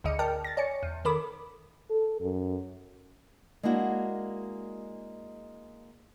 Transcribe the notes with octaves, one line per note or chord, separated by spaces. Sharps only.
G#1 D2 D3 D#5 C#7
A#4 D5 G5 A5 F6
A6 A#6
C#5 D5 G#5 C#7
E2
D#3 A4 A#4 B5 D6
A4
F#2
G#3 A#3 D4 E4 F#4